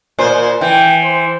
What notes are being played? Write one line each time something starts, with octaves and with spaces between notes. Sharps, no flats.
A#2 C5
E3 G5
C5